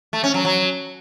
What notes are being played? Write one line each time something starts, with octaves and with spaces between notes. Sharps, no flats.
A3
C#4
F#3
F#3